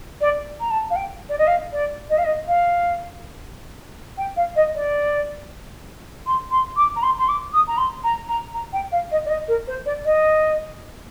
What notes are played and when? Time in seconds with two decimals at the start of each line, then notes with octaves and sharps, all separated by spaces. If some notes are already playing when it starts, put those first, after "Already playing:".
0.21 D5
0.60 A#5
0.70 A5
0.90 F5
0.95 G5
1.29 D5
1.38 D#5
1.47 F5
1.72 D5
2.09 D#5
2.17 F5
2.24 D#5
2.48 F5
4.17 G5
4.36 F5
4.55 D#5
4.75 D5
6.26 C6
6.51 C6
6.76 D6
6.96 A#5
7.02 C6
7.18 C6
7.28 D6
7.53 D#6
7.67 A#5
7.77 C6
8.03 A#5
8.28 A#5
8.54 A#5
8.72 G5
8.91 F5
9.11 D#5
9.25 D5
9.29 D#5
9.48 A#4
9.67 C5
9.85 D5
10.04 D#5